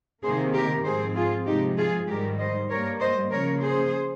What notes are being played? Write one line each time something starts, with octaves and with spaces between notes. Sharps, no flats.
C3 D#3 A#3 G#4 C5
G4 A#4
G#2 F3 C4 G#4 C5
F4 G#4
C3 F3 G#3 D#4 G4
F4 G#4
G#2 D#3 G3 G4 A#4
C5 D#5
G2 G3 A#3 A#4 C#5
C5 D#5
C#3 F3 A#3 A#4 C#5
G#4 C5